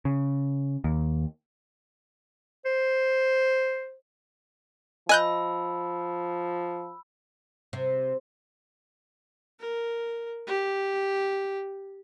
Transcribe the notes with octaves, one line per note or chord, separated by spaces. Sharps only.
C#3
D#2
C5
F3 D#5 G#5 B5 E6 F#6 G6
C3
A#4
G4